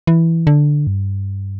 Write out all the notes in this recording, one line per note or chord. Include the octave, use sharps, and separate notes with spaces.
E3
D3
G2